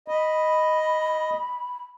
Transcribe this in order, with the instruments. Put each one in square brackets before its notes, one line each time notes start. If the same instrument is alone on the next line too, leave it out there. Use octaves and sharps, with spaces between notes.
[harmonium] D#5 [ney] B5